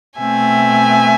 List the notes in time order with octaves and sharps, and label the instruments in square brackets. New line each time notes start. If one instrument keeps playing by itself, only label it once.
[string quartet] B2 A3 C4 E5 G#5